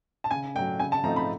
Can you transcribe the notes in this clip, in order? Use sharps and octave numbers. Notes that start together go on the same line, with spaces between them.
A5
C#3 G#5
F#3 A3 G5
C#3 G#5
A5
F3 A3 C4 D#4 A#5
B5